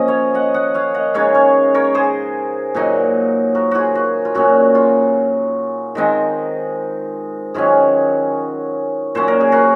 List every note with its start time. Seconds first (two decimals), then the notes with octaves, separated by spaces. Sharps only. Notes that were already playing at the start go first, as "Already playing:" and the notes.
Already playing: F3 A#3 C#4 D#5
0.08 C#5 F5
0.34 D#5 F#5
0.54 D#5 F#5
0.74 C#5 F5
0.94 D#5 F#5
1.14 C#3 G#3 D#4 C#5 F5
1.35 C#5 F5
1.75 A#4 C#5
1.94 G#4 C5
2.75 A#2 F#3 A#3 D#4
3.55 F#4 A#4
3.71 F4 F#4 G#4
3.95 F#4
4.25 F4
4.35 A#2 F#3 C#4 F#4
4.75 F4
5.95 D#3 G#3 C4 D#4
7.54 D#3 F#3 C#4 F4 G#4
9.15 A#2 F#3 C#4 C5
9.28 A#4
9.41 G#4
9.52 F#4 A#4